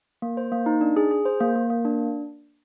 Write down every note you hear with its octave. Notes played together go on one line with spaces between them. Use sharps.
A#3
C5
A#3
D#4
D4
G#4
G#4
C5
A#3
A#3
A#3
D4